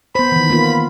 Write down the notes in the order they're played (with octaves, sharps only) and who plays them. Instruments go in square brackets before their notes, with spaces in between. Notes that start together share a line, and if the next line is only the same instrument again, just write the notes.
[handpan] B3 C5 [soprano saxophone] B5
[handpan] D#3 E3
A#3 B3 F4